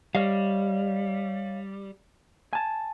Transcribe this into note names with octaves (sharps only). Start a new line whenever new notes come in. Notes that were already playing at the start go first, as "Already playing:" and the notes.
G3 C#5 D#5 F5
G#5 A5